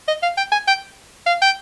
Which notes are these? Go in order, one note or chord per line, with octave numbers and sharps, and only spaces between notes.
D#5
F5
G5
G#5
G5
F5
G5